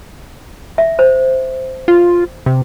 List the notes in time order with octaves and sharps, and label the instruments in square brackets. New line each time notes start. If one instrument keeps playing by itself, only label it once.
[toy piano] E5
C5
[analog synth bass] F4
C3